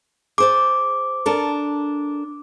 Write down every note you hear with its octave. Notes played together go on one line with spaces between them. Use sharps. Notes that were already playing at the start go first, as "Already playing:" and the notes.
G#4 C5 D5 D6
D4 A4 A#4